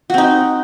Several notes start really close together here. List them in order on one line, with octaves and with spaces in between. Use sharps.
F#4 C4 D#4